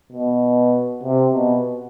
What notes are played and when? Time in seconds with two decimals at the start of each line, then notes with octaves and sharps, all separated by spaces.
0.12 B2
1.03 C3
1.34 B2